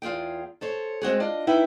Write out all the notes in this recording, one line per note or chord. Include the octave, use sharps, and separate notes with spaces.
E2 F4 G#4 G5
A4 C5 C#5
G#3 C4 F#4 G#4
D4 F4 D#5
B3 D#4 E4 B4 E5 G5